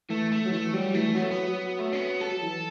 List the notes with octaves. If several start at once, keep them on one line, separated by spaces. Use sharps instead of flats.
E3 A3
A3
F#3
E3 A3
F#3 G3
E3 A3
F#3 B3
A3
B3
F#3
A3
C#4
B3
A4
F#3
E3